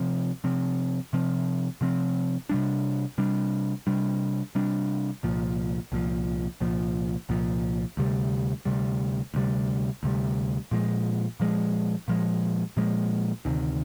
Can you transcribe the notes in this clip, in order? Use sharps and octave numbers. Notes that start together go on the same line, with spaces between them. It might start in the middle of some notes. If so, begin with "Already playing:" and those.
Already playing: C3 F3 C4
C3 F3 C4
C3 F3 C4
C3 F3 C4
C3 G3 D4
C3 G3 D4
C3 G3 D4
C3 G3 D4
C2 A#2 F3
C2 A#2 F3
C2 A#2 F3
C2 A#2 F3
D2 C3 G3
D2 C3 G3
D2 C3 G3
D2 C3 G3
A#2 F3 G#3
A#2 F3 G#3
A#2 F3 G#3
A#2 F3 G#3
D2 C3 D#3